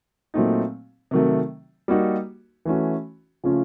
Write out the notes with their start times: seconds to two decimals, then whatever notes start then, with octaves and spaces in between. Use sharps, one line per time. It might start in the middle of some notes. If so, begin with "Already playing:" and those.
0.34 A#2 F#3 A3 C4 D#4
1.11 C3 D#3 F#3 A3
1.88 G3 A#3 D#4 F#4
2.65 E3 A3 C#4 F#4
3.44 C#3 F3 A3 C#4 F4